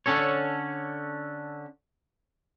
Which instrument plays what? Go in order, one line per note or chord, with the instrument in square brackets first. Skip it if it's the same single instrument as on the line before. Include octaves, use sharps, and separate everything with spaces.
[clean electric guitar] D3 C#4 A4 C#5